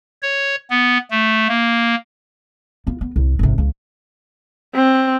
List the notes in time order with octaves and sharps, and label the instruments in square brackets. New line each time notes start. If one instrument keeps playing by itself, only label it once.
[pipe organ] C#5
B3
A3
A#3
[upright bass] B3 F4
B3
C2
G#1 C3
C#2 E3
[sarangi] C4